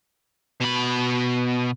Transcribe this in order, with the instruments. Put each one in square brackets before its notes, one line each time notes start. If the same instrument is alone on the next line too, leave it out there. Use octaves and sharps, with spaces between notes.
[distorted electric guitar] B2 B5